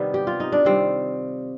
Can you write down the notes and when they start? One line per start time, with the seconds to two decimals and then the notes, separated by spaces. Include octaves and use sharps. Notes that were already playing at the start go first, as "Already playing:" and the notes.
Already playing: C3 D#3 G3 B3
0.14 G4
0.27 F4
0.40 D#4
0.52 D4
0.65 C3 D#3 G3 C4